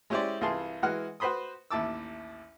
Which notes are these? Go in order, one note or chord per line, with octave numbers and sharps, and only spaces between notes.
G#3 C#4 E4 G4 C5 D5
C2 E3 F4 G#4 A5 C6
E3 G#3 F#4 F#5 F6
F#4 B4 C5 B5 C6 D#6
A1 D#2 E4 A5 D6 E6